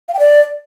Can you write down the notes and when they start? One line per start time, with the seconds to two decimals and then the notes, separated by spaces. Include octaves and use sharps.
0.08 F5
0.14 G5
0.19 D5